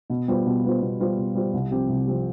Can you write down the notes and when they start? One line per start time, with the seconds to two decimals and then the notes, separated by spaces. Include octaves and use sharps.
0.10 B2
0.28 G3 B3 F4 C5
0.46 B2
0.64 G3 B3 F4 C5
0.82 B2
1.00 G3 B3 F4 C5
1.18 B2
1.35 G3 B3 F4 C5
1.54 C2
1.71 C3 F3 C4 G4
1.89 C2
2.07 C3 F3 C4 G4